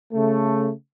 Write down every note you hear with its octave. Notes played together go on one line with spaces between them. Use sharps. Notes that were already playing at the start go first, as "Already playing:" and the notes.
C#3 A3